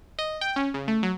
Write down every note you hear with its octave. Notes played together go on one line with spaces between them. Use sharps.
D#5
G5
C#4
C#3
A3
F#3